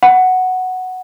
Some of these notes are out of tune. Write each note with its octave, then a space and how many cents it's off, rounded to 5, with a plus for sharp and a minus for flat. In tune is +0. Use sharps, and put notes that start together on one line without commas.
F#5 +0 B5 -5